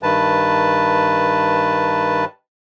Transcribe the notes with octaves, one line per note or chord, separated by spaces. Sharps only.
G2 D#3 B4 A5